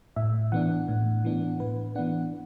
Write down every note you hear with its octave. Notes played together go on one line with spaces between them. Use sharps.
A2 E5
E3 B3 D4 F#5
A2
E3 B3 D4
A2 B4
E3 B3 D4 F#5